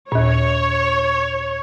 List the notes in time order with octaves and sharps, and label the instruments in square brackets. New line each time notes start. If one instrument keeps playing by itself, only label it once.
[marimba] D#2 A#2 [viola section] C#5